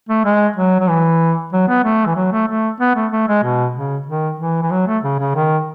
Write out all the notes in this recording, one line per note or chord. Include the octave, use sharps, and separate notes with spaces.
A3
G#3
F#3
F#3
E3
F#3
B3
A3
E3
F#3
A3
A3
B3
A3
A3
G#3
B2
C#3
D#3
E3
E3
F#3
A3
C#3
C#3
D#3